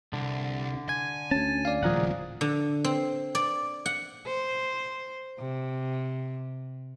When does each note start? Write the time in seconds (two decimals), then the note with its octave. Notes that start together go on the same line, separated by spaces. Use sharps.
0.13 C2 D3
0.89 G#5 G#6
1.31 D2 C#4 A5
1.65 D5 F5
1.83 D#1 A2 C#3 F3 G#4 A#4 F#5
2.41 D3
2.85 C4
3.35 D5
3.86 F#5
4.26 C5
5.39 C3